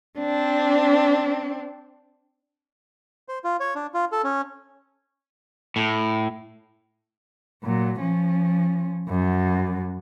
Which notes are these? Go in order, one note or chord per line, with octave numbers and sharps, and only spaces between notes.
C4 D4
C5
F4
C#5
D4
F4
A4
C#4
A2
A#2 F#3
F3 C#4
F#2